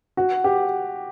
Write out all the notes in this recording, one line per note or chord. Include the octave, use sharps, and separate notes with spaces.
F#4
G4